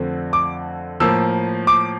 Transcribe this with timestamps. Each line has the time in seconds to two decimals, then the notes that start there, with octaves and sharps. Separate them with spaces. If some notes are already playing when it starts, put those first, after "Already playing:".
Already playing: F2 D3 A3 C4
0.33 D6
1.00 A2 F3 A#3 E6
1.67 D6